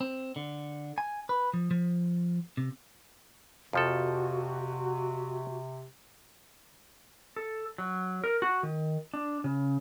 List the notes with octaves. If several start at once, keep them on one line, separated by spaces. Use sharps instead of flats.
C4
D3
G#5
B4
F3
F3
C3
F2 C3 F3 F#4 A4
A4
F#3
A#4
F#4
D#3
D4
C#3